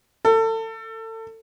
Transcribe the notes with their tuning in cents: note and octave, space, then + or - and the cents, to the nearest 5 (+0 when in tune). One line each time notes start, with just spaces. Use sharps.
A4 +30